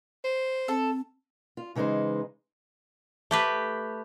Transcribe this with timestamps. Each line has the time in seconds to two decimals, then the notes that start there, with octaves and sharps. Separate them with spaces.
0.24 C5
0.68 C4 A4
1.57 F4
1.75 C#3 E3 G#3 D#4 C5
3.31 A3 G4 B4